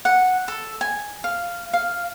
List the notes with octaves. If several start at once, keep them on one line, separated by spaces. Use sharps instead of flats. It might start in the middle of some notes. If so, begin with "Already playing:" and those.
F#5
A4
G#5
F5
F5